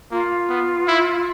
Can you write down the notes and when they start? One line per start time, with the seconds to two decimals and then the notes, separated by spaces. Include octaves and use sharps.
0.11 A#3 F4
0.49 B3
0.88 E4